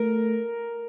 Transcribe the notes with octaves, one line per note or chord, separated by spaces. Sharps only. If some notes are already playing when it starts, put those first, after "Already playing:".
Already playing: A3 A#4